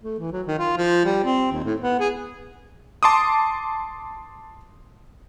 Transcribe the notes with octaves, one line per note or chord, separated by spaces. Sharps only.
A3
E3
F#3
D#3
F4
F3
G3
C4
D#2
A2
B3
G#4
A5 C6 D6 D#6